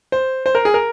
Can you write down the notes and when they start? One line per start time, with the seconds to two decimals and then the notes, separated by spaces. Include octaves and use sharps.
0.12 C5
0.46 C5
0.55 A#4
0.65 G#4
0.74 A#4